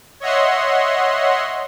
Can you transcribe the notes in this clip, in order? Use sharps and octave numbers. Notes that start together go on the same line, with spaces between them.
C#5 D#5 E5 F#5 C6